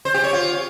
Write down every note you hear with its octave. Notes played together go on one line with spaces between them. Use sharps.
C5
G4
C#5
F4